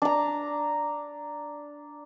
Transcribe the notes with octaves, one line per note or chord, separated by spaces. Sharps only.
D4 A#5